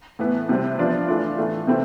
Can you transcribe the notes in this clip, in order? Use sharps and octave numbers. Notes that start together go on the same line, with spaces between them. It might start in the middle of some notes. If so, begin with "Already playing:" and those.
A2 E3 B3 E4
C3 G3 C4
F3 B3 D4 F4
E3 A3 D4 F4
A2 E3 A3
C3 E3 A3 C4 E4